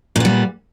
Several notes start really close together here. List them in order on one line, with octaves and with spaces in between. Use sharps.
A#2 B3 G3